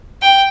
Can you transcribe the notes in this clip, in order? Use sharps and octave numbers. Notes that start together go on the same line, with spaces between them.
G5